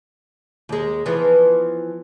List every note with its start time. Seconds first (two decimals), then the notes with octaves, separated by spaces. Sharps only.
0.69 D#2 G#3
1.06 E3 F3 B3